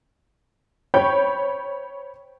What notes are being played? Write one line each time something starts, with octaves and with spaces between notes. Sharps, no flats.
C5 C#5 G5 B5 C#6 G6